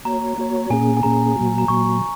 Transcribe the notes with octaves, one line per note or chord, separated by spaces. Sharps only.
A#3 F#4 C#5 A#5
A#3 F#4 C#5
A#2 A#3 C#4 G#4 G#5
G#5
A#2 A#3 C#4 G#4 A#5
A#2 F#3 A#3 F#4
A#5
A#2 F#3 A#3 F#4 C#6